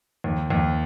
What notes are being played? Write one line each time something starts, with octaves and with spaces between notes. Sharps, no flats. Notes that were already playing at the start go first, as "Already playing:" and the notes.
D#2
D#2